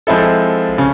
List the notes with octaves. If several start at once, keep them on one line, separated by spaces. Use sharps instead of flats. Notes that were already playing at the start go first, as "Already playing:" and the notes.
F3 G#3 C4 E4 A4
C#3